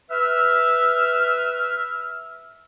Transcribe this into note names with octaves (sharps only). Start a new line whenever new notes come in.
B4 E5 F6